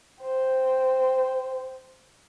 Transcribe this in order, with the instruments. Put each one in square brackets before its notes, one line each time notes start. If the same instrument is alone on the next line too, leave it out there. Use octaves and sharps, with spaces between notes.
[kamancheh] C5 G5